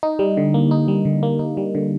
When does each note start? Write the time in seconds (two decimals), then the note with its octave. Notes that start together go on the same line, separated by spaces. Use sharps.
0.03 D#4
0.19 G3
0.37 D3
0.54 A#3
0.71 D#4
0.88 G3
1.05 D3
1.23 A#3
1.39 D#4
1.57 G3
1.75 D3